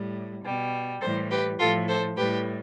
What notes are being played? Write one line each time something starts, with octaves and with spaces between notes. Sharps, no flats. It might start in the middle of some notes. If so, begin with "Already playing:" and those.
Already playing: A2 G3
B2 G3
A2 E3 G3 A4 C5
G4 B4
A2 F3 F4 A4
A4 C5
A2 G3 G4 B4